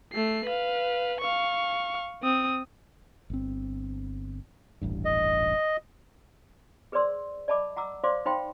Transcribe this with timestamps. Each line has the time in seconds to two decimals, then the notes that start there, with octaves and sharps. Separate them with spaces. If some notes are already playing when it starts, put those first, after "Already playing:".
0.13 A3 C7
0.45 B4 F5
1.20 F5 C#6
2.23 C4 D#6
3.30 G1 C4
4.82 D#1 A1 G2
5.05 D#5
6.92 G#4 B4 C5 D5 C6 E6
7.48 D5 D#5 A5 B5 D6
7.76 F#5 A#5 D6 E6
8.04 C5 D5 F5 C6 D6
8.25 D#4 C5 F5 G5 B5 C6